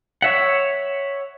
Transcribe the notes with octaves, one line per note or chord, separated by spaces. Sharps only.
C#5 E5 F#5